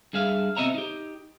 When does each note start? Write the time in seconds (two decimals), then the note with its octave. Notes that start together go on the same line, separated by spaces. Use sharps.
0.13 G2 G#4 E5 F5
0.57 B2 C4 D#5 E5 A#5
0.74 D#4 G4